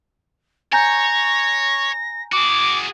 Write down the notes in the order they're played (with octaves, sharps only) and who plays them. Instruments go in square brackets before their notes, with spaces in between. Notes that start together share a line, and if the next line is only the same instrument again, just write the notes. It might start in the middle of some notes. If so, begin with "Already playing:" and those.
[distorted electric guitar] C#5 [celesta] G#5 A#5 G6 [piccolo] A#6
[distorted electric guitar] F#4 G#4 [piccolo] D6